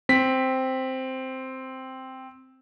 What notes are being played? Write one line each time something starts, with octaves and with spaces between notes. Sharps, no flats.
C4 B6